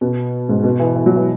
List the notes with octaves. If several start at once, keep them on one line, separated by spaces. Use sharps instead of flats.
B2
G#2
B2
E3
E3
F#3
E3